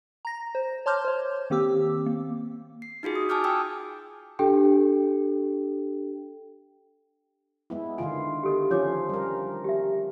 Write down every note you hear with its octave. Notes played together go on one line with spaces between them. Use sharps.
A#5 A#6
C5
C#5 A5 C6 D6 F6 G6
C5 C#5
D#3 A#3 C4 G4 D6 E6
A#3
C7
D#4 F4 F#4 G#4
D#6
G#5 A5 D6 F6 G6
G5 G#5 D#6 E6 G6
D4 G4 A4 G5
G#3 B3 E4
D3 D#3 F4 G#5
G4 A4 D#5
F3 C#4 F4 C#5 D6
G3 A#4
G4 E5